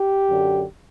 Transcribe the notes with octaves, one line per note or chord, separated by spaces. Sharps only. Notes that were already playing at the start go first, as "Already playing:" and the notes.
Already playing: G4
F#2 D3